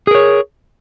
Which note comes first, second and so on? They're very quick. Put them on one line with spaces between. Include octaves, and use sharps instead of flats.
G#4 A#4 C#5